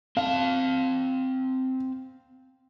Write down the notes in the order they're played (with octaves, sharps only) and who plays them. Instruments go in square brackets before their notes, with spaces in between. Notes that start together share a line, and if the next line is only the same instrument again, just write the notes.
[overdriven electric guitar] C4 A5 [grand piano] F5